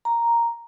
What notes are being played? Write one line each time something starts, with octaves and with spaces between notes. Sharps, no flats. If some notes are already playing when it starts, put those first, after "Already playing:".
A#5